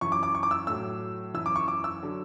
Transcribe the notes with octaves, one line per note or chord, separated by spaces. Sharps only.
F#2 E3 C#6
D6
D6
C#6
D6
E6
A2 F#3 E6
F#2 E3 E6
D6
C#6
D6
E6
D3 F#3